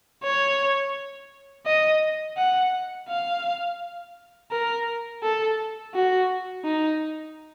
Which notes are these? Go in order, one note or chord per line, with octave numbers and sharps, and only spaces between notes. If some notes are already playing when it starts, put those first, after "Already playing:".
C#5
D#5
F#5
F5
A#4
A4
F#4
D#4